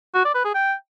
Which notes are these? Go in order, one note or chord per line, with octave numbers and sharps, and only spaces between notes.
F#4
D5
B4
G#4
G5